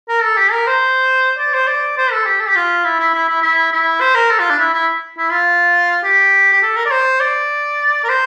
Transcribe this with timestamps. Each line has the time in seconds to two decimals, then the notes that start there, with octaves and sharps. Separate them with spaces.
0.09 A#4
0.23 A4
0.37 G4
0.52 A#4
0.67 C5
1.39 D5
1.54 C5
1.68 D5
1.97 C5
2.12 A4
2.26 G4
2.40 A4
2.47 G4
2.56 F4
2.84 E4
3.00 E4
3.14 E4
3.29 E4
3.42 E4
3.72 E4
4.01 C5
4.15 A#4
4.31 A4
4.39 F4
4.50 D4
4.58 E4
4.74 E4
5.18 E4
5.31 F4
6.04 G4
6.53 G4
6.62 A4
6.77 A#4
6.86 D5
6.91 C5
7.20 D5
8.04 A#4
8.09 C5